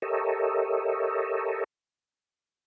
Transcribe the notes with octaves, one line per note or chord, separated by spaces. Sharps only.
G4 A4 A#4 C#5 D#5 E5